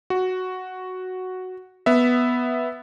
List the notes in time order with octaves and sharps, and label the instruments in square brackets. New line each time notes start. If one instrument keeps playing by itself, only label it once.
[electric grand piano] F#4
B3 E5